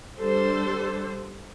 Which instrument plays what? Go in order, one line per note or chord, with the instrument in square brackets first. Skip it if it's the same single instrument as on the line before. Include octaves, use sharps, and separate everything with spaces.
[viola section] G3 D4 A4 C5